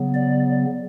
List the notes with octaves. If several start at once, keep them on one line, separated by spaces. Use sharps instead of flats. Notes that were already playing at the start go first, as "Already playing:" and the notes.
Already playing: C#3 F#3 B3
D5